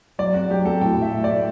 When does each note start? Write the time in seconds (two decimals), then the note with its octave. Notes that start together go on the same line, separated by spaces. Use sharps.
0.19 F#3 D5
0.34 C4 F#4
0.50 F#3 G4
0.65 F#3 A4
0.81 A2 G5
0.97 A2
1.02 E5
1.13 A2
1.24 A2 D5